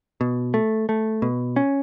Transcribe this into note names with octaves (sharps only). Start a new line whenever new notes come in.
B2
A3
A3
B2
C#4